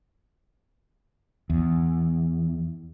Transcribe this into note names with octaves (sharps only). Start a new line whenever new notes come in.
E2